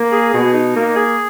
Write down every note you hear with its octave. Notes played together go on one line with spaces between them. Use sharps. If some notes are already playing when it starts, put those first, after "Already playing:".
Already playing: A#3
G#4
B2
D#4
A#3
G#4